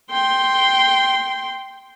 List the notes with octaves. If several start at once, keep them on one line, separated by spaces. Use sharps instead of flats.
G5 C6